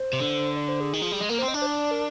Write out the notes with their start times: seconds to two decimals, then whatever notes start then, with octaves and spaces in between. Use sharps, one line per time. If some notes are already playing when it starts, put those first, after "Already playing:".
Already playing: C5
0.13 C3
0.20 D3
0.56 D5
0.68 C5
0.80 G#4
0.93 D#3
1.02 F3
1.12 G3
1.20 G#3
1.29 A#3 A#4
1.39 C5
1.42 C4
1.48 D#5
1.54 D4 D5
1.62 C5
1.66 D5
1.79 D5
1.91 A#4